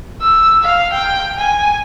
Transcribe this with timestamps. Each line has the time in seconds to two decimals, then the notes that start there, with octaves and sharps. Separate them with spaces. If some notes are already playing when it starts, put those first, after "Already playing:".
0.21 E6
0.63 F5
0.93 G5
1.38 G#5